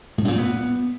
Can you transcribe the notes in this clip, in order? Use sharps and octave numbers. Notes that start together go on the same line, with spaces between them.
A2
F#2
A#2
B3